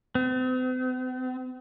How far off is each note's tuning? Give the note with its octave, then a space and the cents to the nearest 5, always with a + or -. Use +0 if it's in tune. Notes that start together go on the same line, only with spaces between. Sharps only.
C4 -45